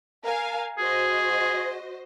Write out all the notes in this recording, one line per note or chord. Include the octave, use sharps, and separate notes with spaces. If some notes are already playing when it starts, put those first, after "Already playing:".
A#4 F5 G#5
F#4 G#4 C5 D#5